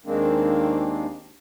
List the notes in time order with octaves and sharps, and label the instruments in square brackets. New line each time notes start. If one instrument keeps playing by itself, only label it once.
[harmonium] D#2 D#3 G#3 A#3 C4 D4